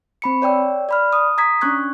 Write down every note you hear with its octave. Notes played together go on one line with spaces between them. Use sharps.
C4 B5 C#7
C#5 D5 G5 E6
D5 B5 F6
D#6
A#5 D#6 G#6 B6
C#4 D4 C#6 F#6 G#6